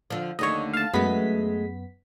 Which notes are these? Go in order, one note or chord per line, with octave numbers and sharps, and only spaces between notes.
D3 F3
D#2 D3 A3 C#5 D#5
F5 A5
F#2 G#3 A3 B3 B6